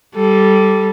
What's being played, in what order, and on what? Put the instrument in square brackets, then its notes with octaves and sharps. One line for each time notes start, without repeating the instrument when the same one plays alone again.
[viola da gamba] G3 [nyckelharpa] A4